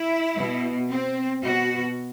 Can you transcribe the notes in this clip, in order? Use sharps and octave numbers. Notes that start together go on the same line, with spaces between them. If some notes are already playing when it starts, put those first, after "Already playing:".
Already playing: E4
B2
C4
B2 F#4